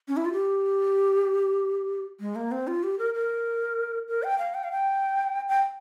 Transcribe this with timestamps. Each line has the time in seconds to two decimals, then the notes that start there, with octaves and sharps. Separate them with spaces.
0.08 C#4
0.17 E4
0.25 F4
0.33 G4
2.20 G#3
2.36 A#3
2.52 C4
2.67 F4
2.83 G4
2.99 A#4
3.14 A#4
4.08 A#4
4.23 G5
4.39 F5
4.54 G5
4.64 F5
4.72 G5
5.48 G5